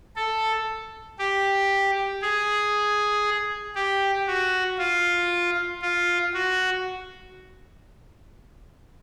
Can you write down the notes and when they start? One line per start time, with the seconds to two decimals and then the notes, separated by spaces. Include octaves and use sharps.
0.16 A4
1.19 G4
2.22 G#4
3.75 G4
4.27 F#4
4.78 F4
5.82 F4
6.34 F#4